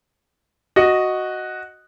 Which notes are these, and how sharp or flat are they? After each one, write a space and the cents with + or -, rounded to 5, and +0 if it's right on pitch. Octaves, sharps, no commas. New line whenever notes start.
F#4 +0 D#5 +0